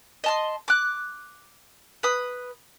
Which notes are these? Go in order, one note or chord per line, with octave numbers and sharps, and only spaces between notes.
D#5 A5 C6
D6 F#6
B4 D#6